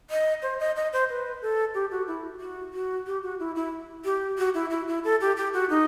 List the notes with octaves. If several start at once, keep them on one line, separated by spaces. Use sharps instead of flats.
D#5
C5
D#5
D#5
C5
B4
A4
G4
F#4
E4
F#4
F#4
G4
F#4
E4
E4
G4
F#4
E4
E4
E4
A4
G4
G4
F#4
D#4